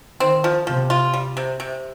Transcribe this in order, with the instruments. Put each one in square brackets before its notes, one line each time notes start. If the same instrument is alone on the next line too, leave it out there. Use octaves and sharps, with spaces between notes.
[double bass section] D#3 [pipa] C4
[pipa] F3
[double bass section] C3 [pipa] F3
[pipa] F4
G3
C3
C3